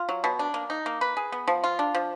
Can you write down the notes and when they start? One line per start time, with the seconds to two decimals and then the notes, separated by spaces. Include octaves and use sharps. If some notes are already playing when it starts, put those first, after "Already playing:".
Already playing: F4
0.09 F#3
0.24 B2
0.39 D4
0.54 A#3
0.70 D#4
0.86 A#3
1.01 B4
1.17 G#4
1.32 B3
1.48 F3
1.64 F4
1.79 D4
1.95 F3